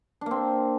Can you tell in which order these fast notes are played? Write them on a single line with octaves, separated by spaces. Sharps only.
D4 A#3 C4